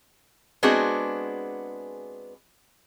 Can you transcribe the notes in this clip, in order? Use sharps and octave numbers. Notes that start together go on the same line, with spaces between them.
G#3 B3 C4 D4 F#4 G#4